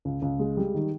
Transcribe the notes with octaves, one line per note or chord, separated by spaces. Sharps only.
C#2
C#2
G#3
G3
D#3